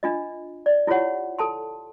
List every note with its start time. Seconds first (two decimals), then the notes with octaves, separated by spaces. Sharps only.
0.03 D4 F4 D#5
0.66 D5
0.87 E4 F4 G4 C#5 F#5
1.39 A4 A5 C6